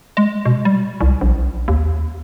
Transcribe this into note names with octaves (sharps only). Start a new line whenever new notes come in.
G#3
B2
G3
C2
A#1
D#2